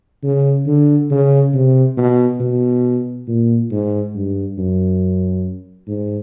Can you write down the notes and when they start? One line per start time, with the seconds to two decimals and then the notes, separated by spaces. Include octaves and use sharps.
0.23 C#3
0.67 D3
1.11 C#3
1.54 C3
1.97 B2
2.40 B2
3.28 A#2
3.71 G#2
4.15 G2
4.58 F#2
5.88 G#2